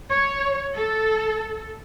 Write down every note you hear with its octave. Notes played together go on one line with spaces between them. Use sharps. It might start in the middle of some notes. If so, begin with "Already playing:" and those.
C#5
A4